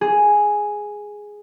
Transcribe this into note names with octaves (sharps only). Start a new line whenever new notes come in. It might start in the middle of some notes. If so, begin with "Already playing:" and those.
G#4